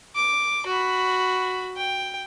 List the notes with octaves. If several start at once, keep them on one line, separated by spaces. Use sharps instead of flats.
D6
F#4 B5
G5